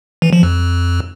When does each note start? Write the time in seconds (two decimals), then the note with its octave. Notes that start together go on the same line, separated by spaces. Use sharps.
0.22 E3
0.33 F3
0.43 F2